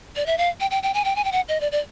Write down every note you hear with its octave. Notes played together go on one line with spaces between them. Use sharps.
D5
E5
F5
G5
G5
G5
G#5
G5
G#5
G5
F#5
D#5
D5
D5